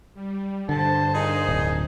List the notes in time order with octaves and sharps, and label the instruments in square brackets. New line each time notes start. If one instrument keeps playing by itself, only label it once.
[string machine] G3
[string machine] G2 C5 [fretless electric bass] D3 [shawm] A5
[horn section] A#2 D#4 [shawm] G#4
[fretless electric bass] D1